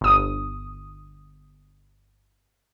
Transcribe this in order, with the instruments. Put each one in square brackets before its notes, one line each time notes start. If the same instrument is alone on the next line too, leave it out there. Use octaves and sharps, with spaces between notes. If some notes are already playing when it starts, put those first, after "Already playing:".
[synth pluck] G1 D#6